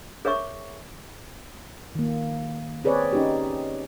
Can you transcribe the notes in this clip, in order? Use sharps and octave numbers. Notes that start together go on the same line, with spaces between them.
G#4 A#4 C#5 E5 C#6
D#3 A#3
C4 G#4 B4 C#5 D5
C#4 D#4 G4